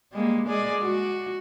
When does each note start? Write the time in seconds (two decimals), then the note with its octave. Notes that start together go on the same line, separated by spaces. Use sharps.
0.12 G3 G#3 A#3
0.48 G#3 G#4 D5
0.82 F#4